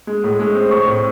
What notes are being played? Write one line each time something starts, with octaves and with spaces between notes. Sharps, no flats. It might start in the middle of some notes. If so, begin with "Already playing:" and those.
G#3
A2
G#3
C4
A2 C#6
A2